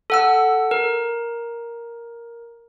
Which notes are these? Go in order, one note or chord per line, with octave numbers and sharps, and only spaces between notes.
A4 F#5 E6
A#4